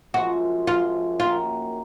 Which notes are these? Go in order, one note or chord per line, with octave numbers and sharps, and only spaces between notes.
F#2 F3 G#3 F#4
F#2 F3 G#3 F4
F#2 D#3 A#3 F4